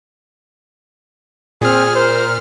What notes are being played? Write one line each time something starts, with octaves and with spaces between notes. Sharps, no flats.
A#2 C4 G#4 F6
A#4 C5